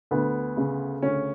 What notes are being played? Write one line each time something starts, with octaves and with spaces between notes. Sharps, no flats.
D2 B3
C#3
D2 C#4